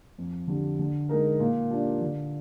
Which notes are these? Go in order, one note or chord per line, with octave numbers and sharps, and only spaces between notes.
F2
D3 G3
D3
G#3 D#4 A#4
A#2
G3 A#3 D4 F4
D3